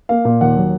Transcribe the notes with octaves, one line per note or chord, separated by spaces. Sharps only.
A#3 F5
A#2
D#2 F#5
F#3